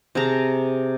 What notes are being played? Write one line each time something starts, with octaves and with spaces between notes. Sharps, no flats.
C3 G#4 A5 A#5